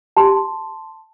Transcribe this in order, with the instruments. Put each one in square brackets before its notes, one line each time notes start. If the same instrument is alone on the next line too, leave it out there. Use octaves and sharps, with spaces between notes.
[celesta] G4 A5 C6